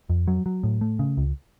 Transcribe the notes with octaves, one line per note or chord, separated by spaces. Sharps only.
F2
F#3
F#3
A2
A3
C#3
C#2